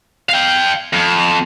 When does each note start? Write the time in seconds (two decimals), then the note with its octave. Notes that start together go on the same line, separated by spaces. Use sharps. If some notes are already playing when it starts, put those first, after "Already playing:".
0.29 F5 G5
0.93 F2